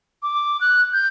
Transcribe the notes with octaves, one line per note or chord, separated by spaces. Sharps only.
D6
F#6
G6